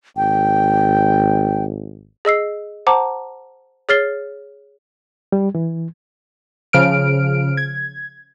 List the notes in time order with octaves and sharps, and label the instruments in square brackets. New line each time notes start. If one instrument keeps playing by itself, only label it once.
[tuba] G#1 [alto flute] G5
[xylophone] G#4 D#5 E6 C7
C5 F#5 A5 A#5 D6
G#4 C#5 F6 A6 C7 G7
[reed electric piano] G3
E3
[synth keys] C#3 F3 F6 D7
G#6